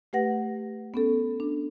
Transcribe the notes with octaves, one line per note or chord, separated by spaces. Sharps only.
A3 G4 B4 F#5 A#6
B3 C#4 A4
D4